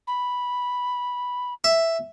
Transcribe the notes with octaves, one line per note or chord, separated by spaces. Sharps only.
B5
E5